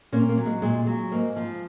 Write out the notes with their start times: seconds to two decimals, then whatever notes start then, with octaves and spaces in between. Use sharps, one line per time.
0.12 A#2 A#3 C#4
0.29 A#3
0.37 F#3
0.46 G#3
0.62 A#2 G#3
0.87 F#3
1.11 G#2 A#3
1.36 F3